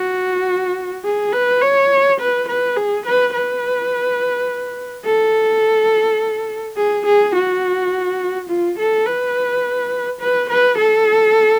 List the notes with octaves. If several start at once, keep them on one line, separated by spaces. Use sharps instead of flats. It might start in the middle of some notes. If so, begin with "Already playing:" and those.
Already playing: F#4
G#4
B4
C#5
B4
B4
G#4
B4
B4
A4
G#4
G#4
F#4
F4
A4
B4
B4
B4
A4